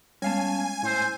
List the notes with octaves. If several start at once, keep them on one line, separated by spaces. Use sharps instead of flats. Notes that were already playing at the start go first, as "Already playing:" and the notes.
G3 G#3 B3 C#4 F5 G#5 A5
A2 C5 E6